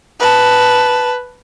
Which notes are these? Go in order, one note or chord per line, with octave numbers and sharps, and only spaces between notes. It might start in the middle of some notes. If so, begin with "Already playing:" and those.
B4 A5